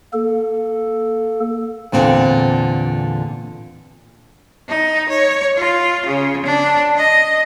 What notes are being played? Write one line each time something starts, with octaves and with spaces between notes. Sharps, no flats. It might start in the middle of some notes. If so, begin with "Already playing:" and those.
A#3 A4
E2 A#2 D3 C4
D#4
C#5
F4
C#3
D4
D#5